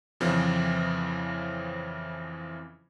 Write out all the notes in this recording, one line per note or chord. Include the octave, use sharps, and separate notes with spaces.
F2 C#3 E3 F3 C4